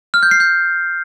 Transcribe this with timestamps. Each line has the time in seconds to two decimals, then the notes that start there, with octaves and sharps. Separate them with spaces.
0.14 F6
0.23 G6
0.31 C7
0.40 G6